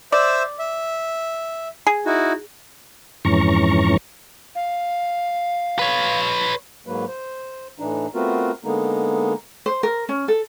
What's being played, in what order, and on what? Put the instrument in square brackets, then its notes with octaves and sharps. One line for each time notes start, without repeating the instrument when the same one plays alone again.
[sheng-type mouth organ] C5 E5 E6 [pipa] D5
[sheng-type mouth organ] E5
[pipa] G#4
[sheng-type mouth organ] D#4 E4 F#4
[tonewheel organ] F2 G#2 E3 C#4 A#5 C#6
[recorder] F5
[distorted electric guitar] B4 C#5
[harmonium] G#2 F#3 A#3 B4
C5
A2 E3 D4 D#4
A3 B3 C4 F4 F#4 A#4
D3 G#3 A#3 B3 D#4
[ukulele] C5
A#4
C#4
A4